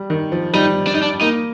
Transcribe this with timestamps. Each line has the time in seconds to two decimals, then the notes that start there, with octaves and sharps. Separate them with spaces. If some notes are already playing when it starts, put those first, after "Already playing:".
Already playing: G3
0.10 D#3
0.32 F3
0.53 G3 D#4
0.87 D4
0.94 D#4
1.02 D4
1.21 A#3 D#4